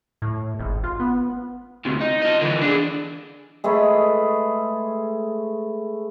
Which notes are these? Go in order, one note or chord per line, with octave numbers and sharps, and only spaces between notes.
A2
G#1
F4
B3
D2 C3
D#4
F4 D#5
D3 E3
D4 G#4
G#3 A3 G#4 B4